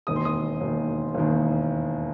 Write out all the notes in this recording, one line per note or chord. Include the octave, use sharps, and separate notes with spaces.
E1 D#2 D#3 D#6
C6
D#6
E1 D#2 D#3
E1 D#2 D#3